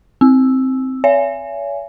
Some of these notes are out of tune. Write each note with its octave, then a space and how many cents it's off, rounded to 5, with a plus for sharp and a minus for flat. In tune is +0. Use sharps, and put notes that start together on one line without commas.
C4 +0 E6 +0
C#5 +40 E5 +35 G#5 +0